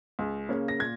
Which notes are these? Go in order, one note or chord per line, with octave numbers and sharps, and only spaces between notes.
C#2
C#3 A#3 C#4
A#6
A#2 G#6